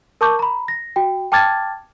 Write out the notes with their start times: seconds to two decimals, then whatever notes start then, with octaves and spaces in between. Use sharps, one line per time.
0.21 A#4 A5 C#6 D6 G6
0.39 A#5 B5
0.68 A#6
0.96 F#4 G5
1.32 G5 A5 D6 F6 G#6 A6